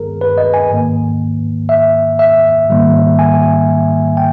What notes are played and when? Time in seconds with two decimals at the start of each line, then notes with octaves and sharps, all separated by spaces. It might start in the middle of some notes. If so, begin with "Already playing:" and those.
Already playing: G2 D#3 G#3 B3 G#4 A#4
0.21 B4
0.38 D#5
0.54 G#5
0.70 G#2 D#3 A#3
1.69 E5
2.19 E5
2.70 G#2 D#3 G3 A#3
3.19 G#5
4.17 G5